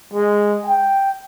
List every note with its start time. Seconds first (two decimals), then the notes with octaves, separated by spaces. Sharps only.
0.13 G#3
0.66 G5